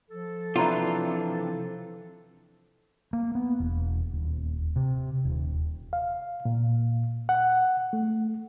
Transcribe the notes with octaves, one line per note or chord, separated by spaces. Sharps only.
F3 A4
C3 E3 D4 F4 C#5 A#5 B5
A#3
B3
E1
D#1
C3
D#1
F5
A#2
F#5
A3